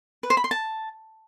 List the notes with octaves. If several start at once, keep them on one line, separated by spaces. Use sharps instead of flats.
B4
C5
B5
C6
A5